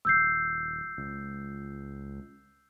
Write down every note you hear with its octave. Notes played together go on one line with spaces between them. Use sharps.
D#1 E6 G6 C7
C#2